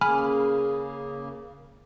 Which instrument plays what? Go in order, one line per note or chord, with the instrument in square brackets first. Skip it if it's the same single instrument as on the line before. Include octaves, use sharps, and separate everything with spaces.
[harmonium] C#3 A#3 [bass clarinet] G#4 [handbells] G#5 B5 F6